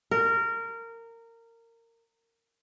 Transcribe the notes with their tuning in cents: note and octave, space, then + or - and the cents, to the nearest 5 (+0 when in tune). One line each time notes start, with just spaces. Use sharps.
A#4 -20